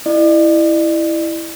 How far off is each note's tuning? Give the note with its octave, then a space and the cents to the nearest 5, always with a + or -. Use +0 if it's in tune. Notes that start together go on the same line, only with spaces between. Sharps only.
E4 +0 D5 +45